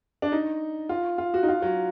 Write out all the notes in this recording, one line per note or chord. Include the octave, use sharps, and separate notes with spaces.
D4
D#4
F4
F4
F#4
D#4
F4
F#3